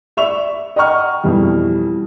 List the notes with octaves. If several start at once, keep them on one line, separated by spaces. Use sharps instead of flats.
D5 E5 C#6 F7
D#5 F#5 G5 A#5 C#6 F6
F2 B2 E3 G3